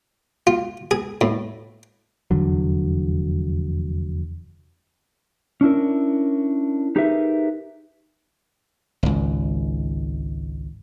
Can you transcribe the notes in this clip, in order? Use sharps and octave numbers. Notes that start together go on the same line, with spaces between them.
F4
G#4
A2
F1 E2 D3 F#3
C#4 D4 E4 A#4
D#4 G4 G#4 A#4 B4 E5
G#1 C#2